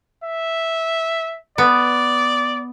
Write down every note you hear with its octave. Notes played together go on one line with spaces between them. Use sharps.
E5
B3 D5